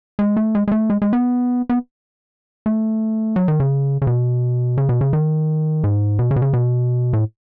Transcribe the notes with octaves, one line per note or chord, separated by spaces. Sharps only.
G#3
A3
G#3
G#3
A3
G#3
G#3
B3
B3
A3
F#3
D#3
C#3
C#3
B2
C#3
B2
C#3
D#3
G#2
B2
C#3
B2
C#3
B2
A2